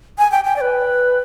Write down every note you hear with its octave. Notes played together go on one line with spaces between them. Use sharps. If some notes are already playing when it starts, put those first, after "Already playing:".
G#5
G5
G5
D5
B4